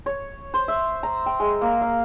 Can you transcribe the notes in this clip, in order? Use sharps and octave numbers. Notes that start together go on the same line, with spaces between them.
C#5
C5
E5
A#5
G5
G#3
A#3
F5